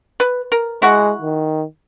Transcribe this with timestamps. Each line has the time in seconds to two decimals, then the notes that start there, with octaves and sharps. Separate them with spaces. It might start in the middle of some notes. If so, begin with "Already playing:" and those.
0.20 B4
0.52 A#4
0.82 G#3 E4 F#4 F#5
1.22 D#3